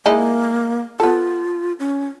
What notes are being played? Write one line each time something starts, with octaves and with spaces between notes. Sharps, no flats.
G#3 A#3 D#4 E4
B3 F4 A4
C#4